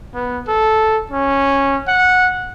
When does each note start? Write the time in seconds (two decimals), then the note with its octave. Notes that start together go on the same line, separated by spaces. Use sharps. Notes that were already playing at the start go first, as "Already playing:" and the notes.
0.15 B3
0.48 A4
1.11 C#4
1.88 F#5